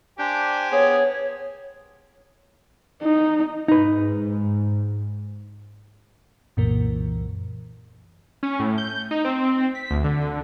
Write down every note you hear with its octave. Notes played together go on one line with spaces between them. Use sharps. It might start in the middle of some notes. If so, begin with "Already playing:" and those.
D4 G4 C5 G5 G#5
B3 G#4 C#5
D#4
G#2 D#4 B4
C2 F#2 A#2 E3 A#4
C#4
A2
G6
D#4
C4
B6
D2
D3